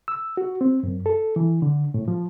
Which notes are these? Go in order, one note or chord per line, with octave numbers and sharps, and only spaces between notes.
E6
F#4
C4
F#2
A4
E3
D3
A2
F3